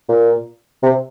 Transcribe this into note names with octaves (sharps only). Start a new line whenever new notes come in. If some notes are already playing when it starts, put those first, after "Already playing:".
A#2
C3